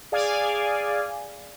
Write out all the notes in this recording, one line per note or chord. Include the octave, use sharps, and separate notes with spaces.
G#4 D5 F5 G#5